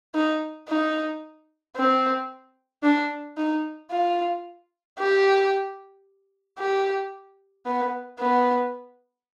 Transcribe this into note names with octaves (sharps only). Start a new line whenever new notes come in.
D#4
D#4
C4
D4
D#4
F4
G4
G4
B3
B3